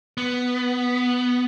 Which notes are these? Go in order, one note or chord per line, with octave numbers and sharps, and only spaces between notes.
B3